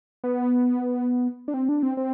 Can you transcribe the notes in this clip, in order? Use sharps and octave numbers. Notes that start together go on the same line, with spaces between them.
B3
D4
C4
D4
C4
C4